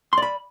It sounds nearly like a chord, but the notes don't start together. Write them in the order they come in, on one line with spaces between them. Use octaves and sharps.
C6 D5 B5